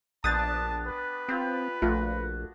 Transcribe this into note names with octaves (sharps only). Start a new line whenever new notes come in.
A#1 B3 D4 G4 A5 D#6 A6
B4
C4 F4 G4
A#1 A3 F4 F#4